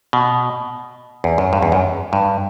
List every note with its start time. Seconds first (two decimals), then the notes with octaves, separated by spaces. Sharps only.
0.13 B2
1.24 E2
1.38 F#2
1.53 G2
1.63 E2
1.72 F#2
2.13 G2